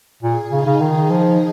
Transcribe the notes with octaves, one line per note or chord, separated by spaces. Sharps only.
A#2 G#4
C#3 D#4
C#3
D#3 D#4
F3